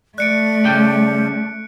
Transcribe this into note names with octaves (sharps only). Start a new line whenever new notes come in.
A3 D5 F#6 C#7 D7
C#3 G3 G5